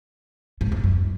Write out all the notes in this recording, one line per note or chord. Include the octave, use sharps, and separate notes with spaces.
G#2
F#2
F#2